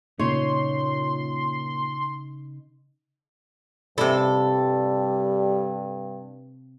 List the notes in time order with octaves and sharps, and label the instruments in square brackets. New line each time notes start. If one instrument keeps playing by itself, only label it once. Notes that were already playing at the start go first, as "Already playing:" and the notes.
[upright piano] A#2 [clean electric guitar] C#3 D#4 [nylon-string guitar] C#5 [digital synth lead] C6
[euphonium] G2 [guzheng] C3 E4 [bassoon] G3 [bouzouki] A4